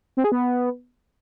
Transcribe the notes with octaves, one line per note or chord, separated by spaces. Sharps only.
C4
G#4
B3